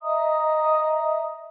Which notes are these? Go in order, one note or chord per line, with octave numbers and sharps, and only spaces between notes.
D#5 E5 A#5 D#6